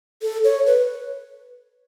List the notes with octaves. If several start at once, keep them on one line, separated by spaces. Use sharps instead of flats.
A4
C#5
B4